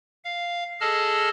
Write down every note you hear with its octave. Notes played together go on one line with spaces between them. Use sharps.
F5
G#4 A4 D#5 A5 F6